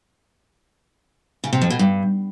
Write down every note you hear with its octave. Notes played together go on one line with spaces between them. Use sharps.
C#3
C3
F2
B2
G2